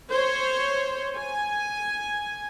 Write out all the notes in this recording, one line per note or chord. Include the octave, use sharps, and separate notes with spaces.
C5 C#5
G#5